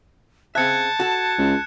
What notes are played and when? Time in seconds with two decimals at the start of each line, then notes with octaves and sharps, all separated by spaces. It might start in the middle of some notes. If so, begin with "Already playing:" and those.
0.55 C#3 C4 E5 A5 F#6 G#6 C#7
1.00 F#4 A4 E7
1.38 C#2